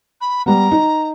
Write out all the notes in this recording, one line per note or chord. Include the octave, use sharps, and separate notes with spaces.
B5
G3 B3 A#5
D#4